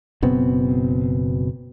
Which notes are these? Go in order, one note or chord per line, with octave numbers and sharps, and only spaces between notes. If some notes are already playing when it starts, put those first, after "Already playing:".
F#1 B2 B3 C4